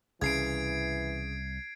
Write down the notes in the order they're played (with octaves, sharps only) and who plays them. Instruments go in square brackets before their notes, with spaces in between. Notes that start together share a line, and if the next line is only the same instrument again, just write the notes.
[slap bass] C2 [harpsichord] C#3 [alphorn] E3 [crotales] G#6 C7 D7